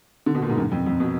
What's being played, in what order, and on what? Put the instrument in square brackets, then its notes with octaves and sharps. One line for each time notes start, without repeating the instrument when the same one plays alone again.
[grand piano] D3
B2
A#2
G#2
F#2
F2
F2
B2